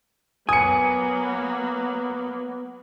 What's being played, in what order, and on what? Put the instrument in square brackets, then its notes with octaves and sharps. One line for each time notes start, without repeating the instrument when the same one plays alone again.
[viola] F#3 A#3 [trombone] B3 [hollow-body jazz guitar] G#5 [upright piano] D#6 C#7